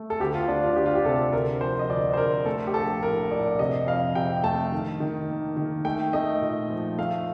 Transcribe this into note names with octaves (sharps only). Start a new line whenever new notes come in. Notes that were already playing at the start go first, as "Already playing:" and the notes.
Already playing: A3
A4
D2 G4
F4
D2 D4
F4
D2 G4
F4
G4
C3 A4
D2 A#4
F3 C5
D#5
D2 D5
C5
D2 A#4
A3 A4
G4
A#1 A4
A2 A#4
A#1 D5
C3 D#5
F2 F5
C3 G5
A3 A5
D#3
D#3
A#3
D#3
A3 G5
A3 D#5
A#2
F3
A3 F5